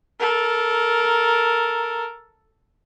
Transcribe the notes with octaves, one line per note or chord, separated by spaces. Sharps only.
A4 A#4